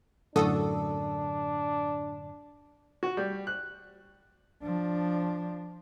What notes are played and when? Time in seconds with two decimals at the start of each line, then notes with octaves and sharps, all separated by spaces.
0.36 F#2 A2 D3 D4 F#4 A4 D#6
3.03 F#4
3.17 G3
3.47 F#6
4.63 F3 D4